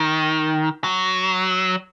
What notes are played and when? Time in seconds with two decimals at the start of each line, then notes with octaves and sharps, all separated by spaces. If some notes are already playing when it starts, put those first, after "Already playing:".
Already playing: D#3
0.84 F#3